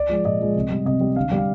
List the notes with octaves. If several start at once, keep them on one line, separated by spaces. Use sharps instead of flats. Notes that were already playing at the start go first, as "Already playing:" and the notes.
Already playing: D5
F3 G#3
A#2 D#5
F3 G#3
C3
G3
C3 D#5
G3
D3 F5
G3
F5